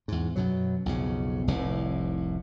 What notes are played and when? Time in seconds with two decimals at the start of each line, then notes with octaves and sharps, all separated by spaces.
0.08 E2 G#2
0.36 F#2 B2 F#3
0.86 B1 F2 C#3
1.48 F1 C2 A2